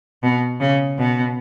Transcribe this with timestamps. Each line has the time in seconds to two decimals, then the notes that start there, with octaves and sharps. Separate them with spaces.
0.23 B2
0.60 C#3
0.98 B2